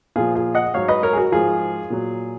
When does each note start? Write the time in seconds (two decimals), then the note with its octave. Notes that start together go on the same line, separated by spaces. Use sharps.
0.16 A#2 F3 F4 G#4
0.35 F4 G#4
0.55 D#5 F#5
0.74 G#2 F#3 C#5 F5
0.88 B4 D#5
1.03 A#4 C#5
1.13 G#4
1.17 F#4 A#4
1.32 G#2 F3 F4 G#4
1.90 A#2 F#3